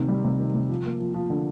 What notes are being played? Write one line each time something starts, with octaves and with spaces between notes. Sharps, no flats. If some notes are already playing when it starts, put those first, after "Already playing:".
Already playing: C3 D#3
G3
C3
D#3
C3
F3
A#3
F3
F3
D3